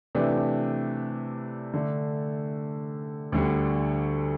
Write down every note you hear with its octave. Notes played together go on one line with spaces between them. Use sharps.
C3 E3 A3 D4
D3 A3 D4
D2 D3 G3